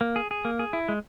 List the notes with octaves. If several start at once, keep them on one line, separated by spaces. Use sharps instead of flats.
A#3
G#4
G#4
A#3
G#4
E4
G#3